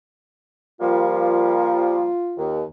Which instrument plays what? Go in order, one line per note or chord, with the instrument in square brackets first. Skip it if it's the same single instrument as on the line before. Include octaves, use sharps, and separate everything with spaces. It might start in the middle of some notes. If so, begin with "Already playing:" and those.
[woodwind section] F3 G3 A#3 [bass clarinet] F4
[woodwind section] D#2